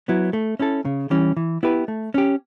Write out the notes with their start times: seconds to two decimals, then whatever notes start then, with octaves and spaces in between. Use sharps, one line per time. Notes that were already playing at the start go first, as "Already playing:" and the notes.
0.08 F#3 B3 E4
0.33 A3
0.60 C#4 E4 A4
0.85 C#3
1.11 E3 G3 C#4
1.37 E3
1.63 B3 E4 G4 B4
1.88 A3
2.14 C#4 G4